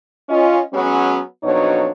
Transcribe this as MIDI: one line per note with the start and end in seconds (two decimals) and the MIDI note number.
0.29 0.60 61
0.29 0.60 65
0.29 0.60 75
0.73 1.20 54
0.73 1.20 56
0.73 1.20 59
0.73 1.20 61
1.43 1.90 41
1.43 1.90 47
1.43 1.90 54
1.43 1.90 62
1.43 1.90 63
1.43 1.90 73